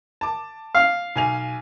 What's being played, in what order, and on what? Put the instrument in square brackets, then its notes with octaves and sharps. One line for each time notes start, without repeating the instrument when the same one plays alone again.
[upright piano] A5 D6
[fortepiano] F5
[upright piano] B1 G#5 F7